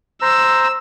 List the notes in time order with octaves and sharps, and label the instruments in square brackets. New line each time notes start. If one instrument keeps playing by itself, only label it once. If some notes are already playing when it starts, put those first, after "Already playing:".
[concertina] C5 A#5 [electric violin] E6